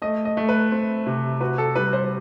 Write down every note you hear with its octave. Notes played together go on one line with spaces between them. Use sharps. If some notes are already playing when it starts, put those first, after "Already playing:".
A3 D#5
D#5
A3
B4
C4
C3
F#4 B4
A4
G3 B4
C5